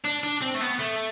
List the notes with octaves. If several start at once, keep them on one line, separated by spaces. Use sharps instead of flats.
D4
D4
C4
A3
B3
A3